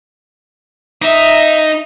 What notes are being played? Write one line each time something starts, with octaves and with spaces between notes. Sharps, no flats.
D#4 E5